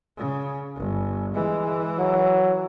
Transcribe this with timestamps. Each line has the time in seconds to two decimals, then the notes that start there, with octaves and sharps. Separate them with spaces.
0.17 C#3
0.76 G1
1.34 E3 G#3
1.98 F#3